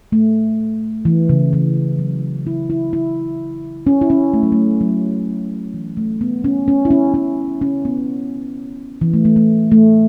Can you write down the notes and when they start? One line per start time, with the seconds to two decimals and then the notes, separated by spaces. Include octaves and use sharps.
0.12 A3
1.05 E3
1.29 C#3
1.53 E3
1.99 F#3
2.47 E4
2.70 E4
2.93 E4
3.87 C#4
4.02 E4
4.10 C#4
4.34 A3
4.43 F#3
4.52 A3
4.81 F#3
5.74 E3
5.97 A3
6.21 B3
6.44 C#4
6.68 C#4
6.85 E4
6.91 C#4
7.14 C#4
7.62 C#4
7.85 B3
9.01 E3
9.13 A3
9.25 A3
9.36 A3
9.72 A3